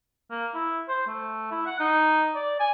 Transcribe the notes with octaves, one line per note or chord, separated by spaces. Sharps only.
A#3
E4
C5
A3
E4
F#5
D#4
D5
G#5